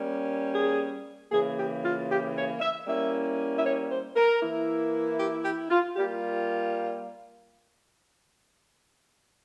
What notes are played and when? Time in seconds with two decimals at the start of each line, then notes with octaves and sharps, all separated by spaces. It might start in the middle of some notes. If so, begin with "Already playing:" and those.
Already playing: G3 A#3 C#4
0.54 G#4
1.32 C#3 E3 A#3 G#4
1.57 G4
1.83 F4
2.09 G4
2.35 C#5
2.60 E5
2.86 G3 A#3 C#4 E4 E5
3.57 E5
3.64 C#5
3.90 C5
4.15 A#4
4.41 E3 A#3 E4
5.19 G4
5.44 G4
5.70 F4
5.96 G3 A#3 F4 G4